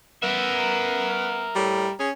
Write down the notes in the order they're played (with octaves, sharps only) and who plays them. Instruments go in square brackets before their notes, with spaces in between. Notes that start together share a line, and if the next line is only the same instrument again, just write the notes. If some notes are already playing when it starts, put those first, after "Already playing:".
[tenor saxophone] B3 [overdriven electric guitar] A#4 E5
[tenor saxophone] A2 [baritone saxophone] G3
[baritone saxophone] C#4 [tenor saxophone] G#4